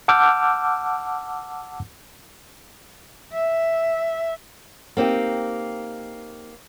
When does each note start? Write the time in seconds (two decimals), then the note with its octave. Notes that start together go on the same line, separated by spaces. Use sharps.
0.08 F#5 A5 D6 E6 F6 G6
3.33 E5
4.97 A#3 C4 D#4 G4